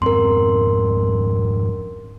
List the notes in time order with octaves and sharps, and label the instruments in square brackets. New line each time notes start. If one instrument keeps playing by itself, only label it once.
[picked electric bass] F2 G#2 C4 [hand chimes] A#4 C6